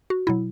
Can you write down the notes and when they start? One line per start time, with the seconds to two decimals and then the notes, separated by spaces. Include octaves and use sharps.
0.10 F#4
0.27 B2 F#3 E4